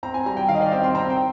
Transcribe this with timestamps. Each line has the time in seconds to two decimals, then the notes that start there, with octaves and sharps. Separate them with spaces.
0.03 C4 A#5
0.14 G#5
0.26 G3 A#5
0.37 G5
0.48 D#3 F5
0.55 D#5
0.61 D5
0.72 C4 G5
0.84 C6
0.95 C4 A#5
1.10 G5